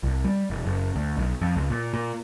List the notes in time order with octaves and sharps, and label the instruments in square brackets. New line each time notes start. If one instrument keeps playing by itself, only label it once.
[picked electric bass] C2
G3
E1
F#1
D2
B1
F2
C#2
A#2
A#2